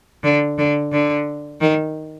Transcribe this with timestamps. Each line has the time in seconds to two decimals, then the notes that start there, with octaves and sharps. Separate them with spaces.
0.24 D3
0.58 D3
0.92 D3
1.61 D#3